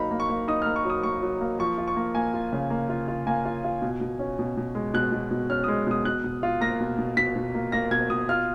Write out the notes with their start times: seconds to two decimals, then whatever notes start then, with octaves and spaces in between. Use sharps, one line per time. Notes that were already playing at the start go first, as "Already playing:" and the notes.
Already playing: F#3 A#3 D#4 A#5 B5
0.11 A#3
0.20 C#6
0.29 A#3
0.48 D#4 D#6
0.62 A#3 F6
0.76 C#6
0.85 F#3 D#6
1.03 A#3 C#6
1.22 F#3
1.41 A#3
1.59 F3 C#6
1.78 F4
1.88 C#6
1.96 A#3
2.15 A#3 G#5
2.34 F4
2.53 C#3
2.70 A#3
2.89 F4
3.08 F4
3.27 A#3 G#5
3.45 F4
3.64 F4
3.82 B2
4.01 B2
4.19 C#4
4.39 B2
4.57 B2
4.75 G#3
4.94 B2 F#6
5.12 B2
5.31 B2
5.50 C#4 F6
5.64 G#3 D#6
5.87 B2 D#6
6.05 B2 F#6
6.24 B2
6.43 F4
6.61 A#3 A#6
6.80 B2
6.98 B2
7.17 B2 B6
7.36 B2
7.55 A#3
7.72 A#3 A#6
7.91 B2 G#6
8.10 B2 D#6
8.29 F4 F6